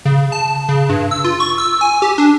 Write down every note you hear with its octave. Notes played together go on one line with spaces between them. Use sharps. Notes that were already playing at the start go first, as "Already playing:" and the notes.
C#3
A5
C#3
G2
E6
F4
C#6
E6
G#5
G4
D4